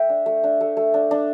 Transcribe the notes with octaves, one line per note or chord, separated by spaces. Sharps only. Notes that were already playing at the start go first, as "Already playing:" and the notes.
Already playing: A3 E5 G5
D4
A3
D4
A3
A3
D4
D4